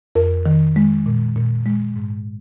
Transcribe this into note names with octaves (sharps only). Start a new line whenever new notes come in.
F2 A#4
D#3
G#3
A#2
A#2
G#3
G#2